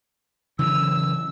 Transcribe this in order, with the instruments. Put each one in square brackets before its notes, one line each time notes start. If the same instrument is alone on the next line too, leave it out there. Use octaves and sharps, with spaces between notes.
[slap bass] C#3 E3 F#3 [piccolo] E6